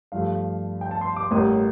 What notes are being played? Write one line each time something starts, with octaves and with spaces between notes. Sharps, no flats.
G2 F3 A3 F5
G5
A5
C6
D6
A1 A2 G3 A#3 D#6